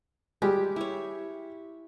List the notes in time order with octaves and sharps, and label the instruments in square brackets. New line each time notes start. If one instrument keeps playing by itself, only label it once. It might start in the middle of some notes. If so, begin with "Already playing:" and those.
[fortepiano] G3 G#3 [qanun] G4
[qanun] E4 C#5